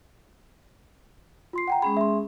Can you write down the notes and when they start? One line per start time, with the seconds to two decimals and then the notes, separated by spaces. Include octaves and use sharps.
1.53 F4 C6 C7
1.68 F#5 G5 A#5
1.82 G#3 C#4 G#4 B5
1.97 E5 C6